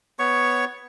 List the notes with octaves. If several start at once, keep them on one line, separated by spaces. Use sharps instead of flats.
B3 C#5 C#6